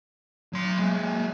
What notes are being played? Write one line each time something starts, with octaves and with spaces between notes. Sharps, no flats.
F#3 C6
G#3 A#3